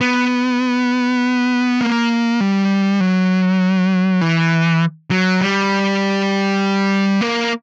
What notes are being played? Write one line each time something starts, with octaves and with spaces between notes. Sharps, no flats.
B3
A#3
G3
F#3
E3
F#3
G3
A#3